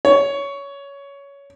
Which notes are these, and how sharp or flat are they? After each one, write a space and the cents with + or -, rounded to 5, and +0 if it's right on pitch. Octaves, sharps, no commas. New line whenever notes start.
C#5 +15